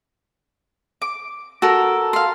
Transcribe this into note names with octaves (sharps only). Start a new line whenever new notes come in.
D6
F#4 A4 A#4
F5 C6